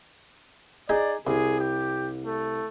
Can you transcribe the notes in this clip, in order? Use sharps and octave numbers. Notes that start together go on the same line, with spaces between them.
D#4 G#4 D5
C2 G#4
G4
A3